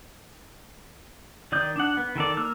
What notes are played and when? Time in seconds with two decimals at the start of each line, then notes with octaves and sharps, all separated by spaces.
1.52 D#3 D5 D#6 G6
1.76 D4 F#5
1.97 B3
2.16 D#3 A4 D5
2.37 A#3 E6 F6